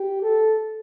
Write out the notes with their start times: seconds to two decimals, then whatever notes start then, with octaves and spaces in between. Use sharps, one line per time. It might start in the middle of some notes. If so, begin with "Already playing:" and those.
Already playing: G4
0.23 A4